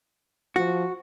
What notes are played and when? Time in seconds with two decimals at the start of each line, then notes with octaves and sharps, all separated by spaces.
0.56 F3 F#4